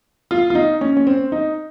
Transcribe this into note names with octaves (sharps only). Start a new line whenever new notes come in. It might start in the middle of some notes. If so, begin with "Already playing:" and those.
F4
F4
D#4
C#4
C#4
C4
D#4